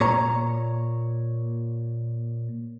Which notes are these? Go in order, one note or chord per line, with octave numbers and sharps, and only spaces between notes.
A#2 C#5 A#5